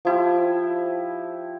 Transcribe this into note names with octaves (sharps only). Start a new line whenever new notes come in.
F3 E4 G4